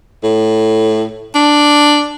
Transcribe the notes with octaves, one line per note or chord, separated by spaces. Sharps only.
A2
D4